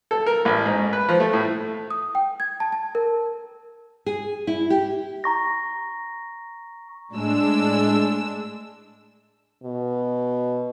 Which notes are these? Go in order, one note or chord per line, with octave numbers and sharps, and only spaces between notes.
A4
A#4
A1
G#2
B4
F3
A3
A2
D#6
G5
G#6
A5
A5
A#4
G#4
E4
G4
A#5 C#6 A#6
A2 G#3 D4 E6
B2